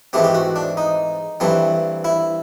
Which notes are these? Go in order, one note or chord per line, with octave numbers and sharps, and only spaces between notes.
G#2 E3 A3 C4 G4
G4
F#4
D4
D#4
G2 E3 A3 C4
E4